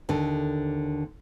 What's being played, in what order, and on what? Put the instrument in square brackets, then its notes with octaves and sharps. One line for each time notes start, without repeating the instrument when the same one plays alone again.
[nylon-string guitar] D#2 D3